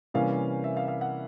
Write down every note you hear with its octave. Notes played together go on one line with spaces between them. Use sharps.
C3 E3 G3 A#3 C#4 F5
E5
F5
F5
F#5